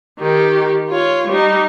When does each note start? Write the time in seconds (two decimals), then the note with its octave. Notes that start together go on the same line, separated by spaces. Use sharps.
0.20 D#3 G4
0.89 F4 C#5
1.28 G3 D#4